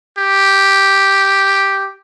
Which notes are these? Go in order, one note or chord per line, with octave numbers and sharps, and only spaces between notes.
G4